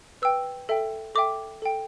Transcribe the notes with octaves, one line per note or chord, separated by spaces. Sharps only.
B4 G5 E6
A4 E5 G5
A4 E5 G5 D6
A4 G5